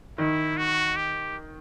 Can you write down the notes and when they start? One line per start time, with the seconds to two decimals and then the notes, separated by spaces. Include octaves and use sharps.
0.18 D#3 E4
0.57 F#4
0.96 G4